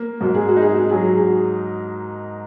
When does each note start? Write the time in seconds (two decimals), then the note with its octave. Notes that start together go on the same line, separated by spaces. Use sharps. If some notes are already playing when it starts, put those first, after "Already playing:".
Already playing: A#3
0.21 G#2 F#4
0.34 G#4
0.48 F#4
0.56 D#4
0.62 G#4
0.75 F#4
0.89 F#3 G#4
1.03 F#4
1.17 G#4